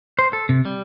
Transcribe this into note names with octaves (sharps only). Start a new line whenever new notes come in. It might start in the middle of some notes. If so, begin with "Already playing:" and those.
C5
A4
C3
G3